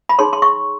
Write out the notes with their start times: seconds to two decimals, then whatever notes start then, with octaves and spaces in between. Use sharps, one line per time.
0.09 B5
0.19 D#4 G#4 C#5 C6
0.33 C6
0.42 C#6